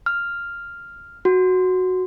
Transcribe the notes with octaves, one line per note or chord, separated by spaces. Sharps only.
F6
F#4